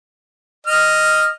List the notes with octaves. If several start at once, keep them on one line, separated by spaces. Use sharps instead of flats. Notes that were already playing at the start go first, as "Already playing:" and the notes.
D#5 F6